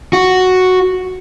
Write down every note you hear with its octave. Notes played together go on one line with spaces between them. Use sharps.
F#4